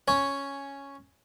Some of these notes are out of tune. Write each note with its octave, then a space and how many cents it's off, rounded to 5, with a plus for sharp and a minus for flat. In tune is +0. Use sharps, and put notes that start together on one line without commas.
C#4 +0 C#5 +0